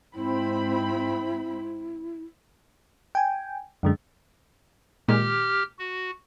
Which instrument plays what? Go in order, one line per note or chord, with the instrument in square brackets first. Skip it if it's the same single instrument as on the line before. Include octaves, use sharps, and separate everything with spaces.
[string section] G#2 C4 B5 [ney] E4
[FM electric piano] G5 G#5
F#2 D3 G#3
[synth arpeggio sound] A#2 D#3 G#3 [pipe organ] G4 F6
[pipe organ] F#4